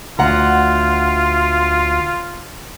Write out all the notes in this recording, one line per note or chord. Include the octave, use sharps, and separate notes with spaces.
D2 F4 F#5 A#5